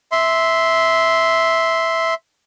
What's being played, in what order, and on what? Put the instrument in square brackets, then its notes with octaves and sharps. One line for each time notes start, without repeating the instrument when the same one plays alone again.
[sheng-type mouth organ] E5 C6